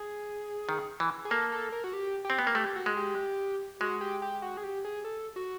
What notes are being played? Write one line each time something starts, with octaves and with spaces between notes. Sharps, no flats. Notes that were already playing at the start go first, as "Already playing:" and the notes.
Already playing: G#4
D#3
E3
G#4
A#3 A4
A4
A#4
F#4
G4
G4
C4
B3
A#3
A3 G4
F#4
G#3
G4
G#3 F#4
G4
G4
F#4
G#4
G4
G#4
A4
F#4